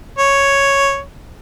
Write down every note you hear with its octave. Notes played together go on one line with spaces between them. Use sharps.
C#5